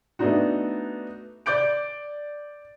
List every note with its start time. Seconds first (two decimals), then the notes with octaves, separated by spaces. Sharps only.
0.19 A3 B3 D4 D#4 F#4
1.46 D5 D6 G6 D7